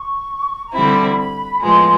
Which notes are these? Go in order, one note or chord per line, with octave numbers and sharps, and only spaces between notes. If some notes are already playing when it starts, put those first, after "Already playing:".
Already playing: C#6
A#5
D3 G3 C4 E4 B5
B5
A2 F3 G#3 B3 C6